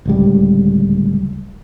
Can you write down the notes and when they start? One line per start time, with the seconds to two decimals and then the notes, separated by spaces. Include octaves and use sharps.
0.05 D1 C#2 G3